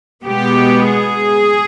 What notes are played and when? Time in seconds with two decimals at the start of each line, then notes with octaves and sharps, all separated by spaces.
0.24 B2 G#3 B3 G4
0.88 G#4